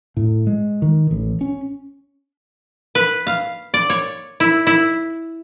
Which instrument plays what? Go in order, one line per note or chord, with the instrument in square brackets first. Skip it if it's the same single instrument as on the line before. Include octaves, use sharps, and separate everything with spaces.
[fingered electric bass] A2
G#3
D#3
A1
C#4
[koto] B4
F5
D5
C#5
E4
E4